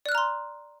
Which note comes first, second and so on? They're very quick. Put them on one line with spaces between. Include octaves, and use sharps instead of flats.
D5 F#6 F6 A#5 C6